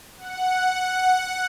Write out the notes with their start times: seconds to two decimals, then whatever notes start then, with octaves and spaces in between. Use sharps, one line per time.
0.18 F#5